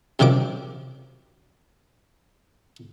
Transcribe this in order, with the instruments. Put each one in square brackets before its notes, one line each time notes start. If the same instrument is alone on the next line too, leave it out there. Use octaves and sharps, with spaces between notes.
[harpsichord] F#2 C3 D#3 F3 D6